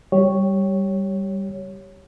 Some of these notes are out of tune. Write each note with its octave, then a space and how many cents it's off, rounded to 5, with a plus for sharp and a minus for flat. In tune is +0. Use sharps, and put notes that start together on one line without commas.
G3 -5 G4 +0 C#5 +0